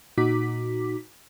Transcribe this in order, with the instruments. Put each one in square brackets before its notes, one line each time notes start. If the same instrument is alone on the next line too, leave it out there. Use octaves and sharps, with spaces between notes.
[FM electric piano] A#2 D#4 F#4 D6 B6